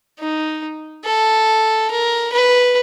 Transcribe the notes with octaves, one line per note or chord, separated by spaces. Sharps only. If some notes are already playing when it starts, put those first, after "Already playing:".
D#4
A4
A#4
B4